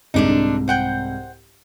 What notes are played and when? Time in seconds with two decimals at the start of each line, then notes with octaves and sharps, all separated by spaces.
0.14 C2 G#2 D3 D4 D#4
0.68 C5 F#5 G5